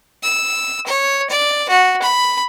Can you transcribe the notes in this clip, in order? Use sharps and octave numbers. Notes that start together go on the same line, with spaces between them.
E6
C#5
D5
F#4
B5